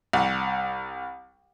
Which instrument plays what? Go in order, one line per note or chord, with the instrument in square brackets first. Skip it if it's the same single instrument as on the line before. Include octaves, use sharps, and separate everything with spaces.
[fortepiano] C2 F#5